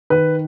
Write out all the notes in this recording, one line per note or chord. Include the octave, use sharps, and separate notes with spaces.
D#3 B4